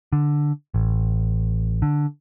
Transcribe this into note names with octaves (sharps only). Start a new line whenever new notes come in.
D3
A1
D3